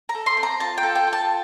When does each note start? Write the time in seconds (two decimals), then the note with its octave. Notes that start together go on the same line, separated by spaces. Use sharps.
0.09 A#5
0.15 A4
0.26 C6
0.37 C4
0.43 A#5
0.60 F4 A5
0.78 G5
0.83 A4
0.95 G5
1.07 F4
1.13 A5